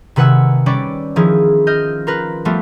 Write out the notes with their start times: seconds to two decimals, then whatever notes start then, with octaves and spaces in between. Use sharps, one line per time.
0.16 C3 D#3 B4 F#5 G#5 E6
0.66 G3 C#4 B4 C#5 D5
1.16 D#3 F3 E4 G#4
1.67 D#5 F6 G6
2.07 F4 A#4 B4
2.45 F3 G3 A3 B3 F4